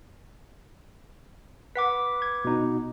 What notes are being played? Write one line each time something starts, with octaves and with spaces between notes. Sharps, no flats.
B4 F#5 D6 B6
G#6
B2 D#4